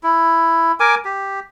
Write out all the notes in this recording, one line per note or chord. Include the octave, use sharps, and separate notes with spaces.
E4
A#4 G#5 D6
G4